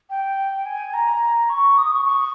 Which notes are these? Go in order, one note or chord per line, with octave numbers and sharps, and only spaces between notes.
G5
G#5
A#5
C#6
D#6
C#6
C#6